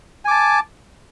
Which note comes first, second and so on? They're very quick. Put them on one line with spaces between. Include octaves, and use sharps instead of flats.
G#5 D6 A5